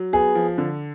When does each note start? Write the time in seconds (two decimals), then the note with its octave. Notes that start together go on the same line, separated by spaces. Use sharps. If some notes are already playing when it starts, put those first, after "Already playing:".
Already playing: F#3
0.13 B3 G#4
0.35 F3
0.58 D3